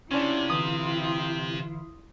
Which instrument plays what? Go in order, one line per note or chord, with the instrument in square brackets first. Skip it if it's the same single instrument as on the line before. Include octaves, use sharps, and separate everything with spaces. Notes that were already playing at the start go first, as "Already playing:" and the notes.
[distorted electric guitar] C3 [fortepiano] C#4 D4 [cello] E4 F4
[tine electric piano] D3 E3 [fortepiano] D#6